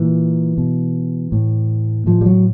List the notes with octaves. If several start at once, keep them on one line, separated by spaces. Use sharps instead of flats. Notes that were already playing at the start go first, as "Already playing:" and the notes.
Already playing: A#2 E3
B2
A2
A2 F3
G3
F#3